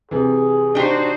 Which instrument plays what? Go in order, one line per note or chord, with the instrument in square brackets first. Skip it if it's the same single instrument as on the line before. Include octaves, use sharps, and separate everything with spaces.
[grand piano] C3 E3 [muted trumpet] G#4
[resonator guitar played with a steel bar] D4 G4 [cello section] D#4 F#4 C5